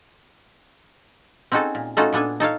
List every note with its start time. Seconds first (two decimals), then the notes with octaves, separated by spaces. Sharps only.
1.52 C4 C#4 D#4 F#4 G#4 A4
1.75 A#2
1.97 A3 C#4 D#4 F4 F#4 A4
2.12 A#2 B3 D4 A4 G#5
2.40 D#4 A4 C#5 F5